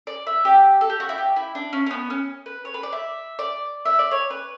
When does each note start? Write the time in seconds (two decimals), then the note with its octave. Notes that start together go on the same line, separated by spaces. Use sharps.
0.07 D5
0.27 E5
0.45 G4
0.81 A4
0.90 G4
1.00 F#4
1.09 E4
1.18 G4
1.36 E4
1.55 D4
1.73 C#4
1.86 C#4
1.91 B3
2.10 C#4
2.46 B4
2.65 C#5
2.74 B4
2.83 D5
2.93 E5
3.39 D5
3.85 E5
3.99 D5
4.11 C#5
4.30 B4